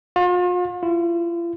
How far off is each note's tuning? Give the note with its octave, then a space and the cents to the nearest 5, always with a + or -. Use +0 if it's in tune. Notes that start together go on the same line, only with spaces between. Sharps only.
F4 +40
F4 -45